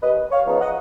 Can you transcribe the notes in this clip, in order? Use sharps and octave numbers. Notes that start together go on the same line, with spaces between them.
D#2 B4 D#5
C#5 F5
C#3 F3 B3 D#4
D#5 F#5